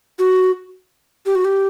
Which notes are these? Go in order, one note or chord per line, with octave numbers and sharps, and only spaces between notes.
F#4
G4
F#4
G4